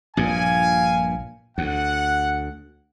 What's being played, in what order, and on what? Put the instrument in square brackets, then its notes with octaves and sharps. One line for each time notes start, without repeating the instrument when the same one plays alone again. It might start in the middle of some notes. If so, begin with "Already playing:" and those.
[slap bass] A#1 G2 A#2 [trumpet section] F5 G#5
[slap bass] D2 [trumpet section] F#5